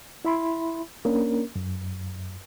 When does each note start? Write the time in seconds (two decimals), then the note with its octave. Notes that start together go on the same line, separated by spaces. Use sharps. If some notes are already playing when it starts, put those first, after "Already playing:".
0.25 E4 E5 B5 C6
1.05 A#3 C#4 D4 A#4
1.56 F#2